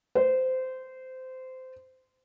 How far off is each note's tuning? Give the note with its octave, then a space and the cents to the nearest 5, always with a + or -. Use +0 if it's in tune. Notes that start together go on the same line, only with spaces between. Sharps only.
C5 -20